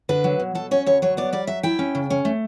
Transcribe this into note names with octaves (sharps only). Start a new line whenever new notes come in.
D3 B4
F#3
B2
F#3 A4
C#4 C#5
D2 C#5
F#3 C#5
B3 D5
G3 D5
F#3 E5
E4 G5
C#4
C#3
C#4
A3